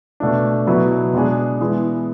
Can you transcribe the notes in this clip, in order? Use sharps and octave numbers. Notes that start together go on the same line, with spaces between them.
B2 A3 D4
B2 F#3 B3 E4 B4
B2 G#3 B3 D4 G#4
E3 G#3 B3